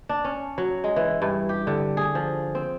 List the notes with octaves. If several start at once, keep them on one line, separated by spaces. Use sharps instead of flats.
D4
C#4
F#3
G#3
E3
G2
G4
D3
G#4
F3
C4